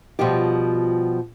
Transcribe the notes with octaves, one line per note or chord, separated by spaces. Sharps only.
B2 F3 G3 F4 G4